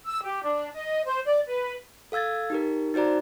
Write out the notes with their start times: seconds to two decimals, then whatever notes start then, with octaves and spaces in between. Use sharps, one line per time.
0.06 E6
0.23 G4
0.43 D4
0.73 D#5
1.06 C5
1.26 D5
1.46 B4
2.12 A4 F5 E6 G#6 A6
2.50 D#4 G4 A#4
2.94 D#4 F#4 C5 D5 A#5